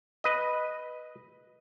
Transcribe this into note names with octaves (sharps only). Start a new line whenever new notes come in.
B4 D#5